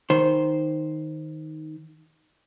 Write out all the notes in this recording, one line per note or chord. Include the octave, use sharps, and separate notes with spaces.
D#3 C5